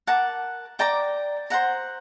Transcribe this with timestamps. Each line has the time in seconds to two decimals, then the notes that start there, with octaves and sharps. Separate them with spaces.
0.07 A#4 F#5 A5 D6
0.79 D5 G5 A#5 D6
1.50 C5 F#5 A#5